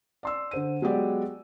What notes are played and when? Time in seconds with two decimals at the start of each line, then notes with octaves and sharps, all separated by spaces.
0.23 D5 C6 E6
0.51 D3 C5 D#7
0.82 F#3 G#3 B3 G4 D5